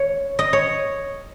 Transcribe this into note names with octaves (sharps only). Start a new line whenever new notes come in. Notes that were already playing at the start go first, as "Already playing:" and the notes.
Already playing: C#5
D#5
C#5